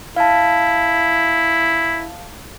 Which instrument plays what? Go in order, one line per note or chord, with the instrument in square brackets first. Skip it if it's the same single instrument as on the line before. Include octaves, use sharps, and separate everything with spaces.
[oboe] E4 [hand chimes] F5 A5